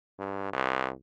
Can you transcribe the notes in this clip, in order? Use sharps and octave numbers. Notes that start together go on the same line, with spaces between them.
G2
C2